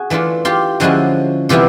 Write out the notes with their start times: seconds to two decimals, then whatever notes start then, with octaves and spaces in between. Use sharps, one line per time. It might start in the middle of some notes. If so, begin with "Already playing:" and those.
Already playing: F#4 G#4
0.10 E3 A3 D4 F4
0.45 F4 G4
0.80 D3 F3 G#3 C#4 E4 F#4
1.49 C3 E3 G3 B3 E4 F4 G4